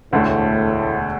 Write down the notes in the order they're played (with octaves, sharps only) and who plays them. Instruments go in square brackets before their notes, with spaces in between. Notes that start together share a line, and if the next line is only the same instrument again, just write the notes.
[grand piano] E1 D2 D3 A3 [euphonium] A2